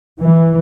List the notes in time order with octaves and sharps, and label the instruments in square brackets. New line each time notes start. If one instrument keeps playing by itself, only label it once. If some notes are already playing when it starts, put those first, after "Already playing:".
[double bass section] E3